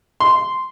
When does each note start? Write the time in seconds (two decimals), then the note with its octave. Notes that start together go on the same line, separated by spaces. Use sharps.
0.20 C6